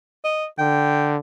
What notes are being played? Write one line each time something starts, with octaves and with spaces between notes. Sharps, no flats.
D#5
D3 G5